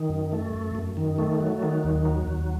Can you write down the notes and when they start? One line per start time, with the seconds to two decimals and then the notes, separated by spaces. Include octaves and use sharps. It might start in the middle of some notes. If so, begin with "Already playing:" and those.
Already playing: D#3
0.09 F#2
0.32 A3
0.53 F#2
0.75 F#2
0.97 D#3
1.18 A3
1.40 F#3
1.63 D#3
1.84 D#2
2.05 F#3
2.27 D#2